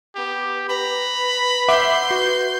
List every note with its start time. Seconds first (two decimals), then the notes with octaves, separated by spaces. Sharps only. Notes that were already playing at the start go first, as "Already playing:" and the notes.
0.16 B3 G4
0.69 B4 A#5 B5
1.69 E5 F#5 C6 D6 G6
2.11 F#4